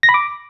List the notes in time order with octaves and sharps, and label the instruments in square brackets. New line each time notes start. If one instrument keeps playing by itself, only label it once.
[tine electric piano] A#6
B5
D6